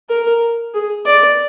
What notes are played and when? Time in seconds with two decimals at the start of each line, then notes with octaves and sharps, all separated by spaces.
0.09 A#4
0.74 G#4
1.06 D5